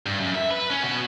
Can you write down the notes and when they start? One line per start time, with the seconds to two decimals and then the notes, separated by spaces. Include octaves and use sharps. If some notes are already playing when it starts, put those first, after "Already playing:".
0.06 G2
0.20 F#2
0.35 E5
0.51 B4
0.70 C#4
0.83 B2 F#4